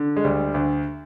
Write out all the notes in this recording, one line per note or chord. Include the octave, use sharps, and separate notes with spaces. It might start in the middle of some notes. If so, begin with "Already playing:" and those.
Already playing: D3
G#3
D2 G3
D2